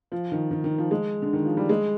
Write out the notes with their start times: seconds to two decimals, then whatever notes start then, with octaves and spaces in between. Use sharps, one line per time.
0.12 F3
0.32 D#3
0.51 D#3
0.64 D#3
0.78 F3
0.91 G#3
1.22 D3
1.33 D#3
1.45 F3
1.57 G3
1.69 G#3